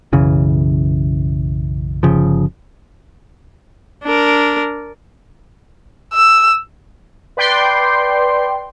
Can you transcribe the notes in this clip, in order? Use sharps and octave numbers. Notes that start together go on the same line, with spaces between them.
B1 F#2 C#3 E3
G1 C#3 F3
D4 A#4
E6
B4 D5 G5 C6